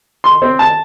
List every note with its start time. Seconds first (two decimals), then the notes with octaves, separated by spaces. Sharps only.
0.24 C6
0.42 C4
0.59 A5